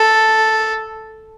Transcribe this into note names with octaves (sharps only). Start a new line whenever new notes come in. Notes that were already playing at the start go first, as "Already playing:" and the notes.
Already playing: A4